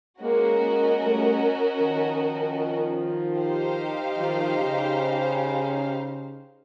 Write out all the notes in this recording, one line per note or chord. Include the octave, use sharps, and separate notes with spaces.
G#3 A#3 C#4 F#4 A#4 D#5
G#3 A#3
G3 A3
D#3 F3
D#4 G4 C5 F5
D#3 F3
C#3